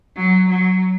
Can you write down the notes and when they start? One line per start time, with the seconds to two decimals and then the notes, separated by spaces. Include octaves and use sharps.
0.16 F#3
0.49 F#3